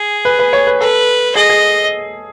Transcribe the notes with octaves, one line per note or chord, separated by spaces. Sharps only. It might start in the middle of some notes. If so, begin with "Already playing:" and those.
Already playing: G#4
B4
B4
C#5
B4
A4 B4
G#4 D#5
G#4